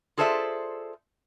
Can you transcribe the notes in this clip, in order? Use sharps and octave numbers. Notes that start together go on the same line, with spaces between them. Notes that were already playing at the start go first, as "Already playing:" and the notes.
F4 G#4 A4 C5 D5 E5